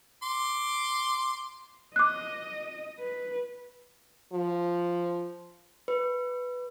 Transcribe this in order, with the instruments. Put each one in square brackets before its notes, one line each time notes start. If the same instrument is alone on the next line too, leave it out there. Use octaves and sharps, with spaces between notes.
[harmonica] C6 D6
[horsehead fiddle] D#5 [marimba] D6 F#6
[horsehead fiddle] B4
[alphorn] F3
[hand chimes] B4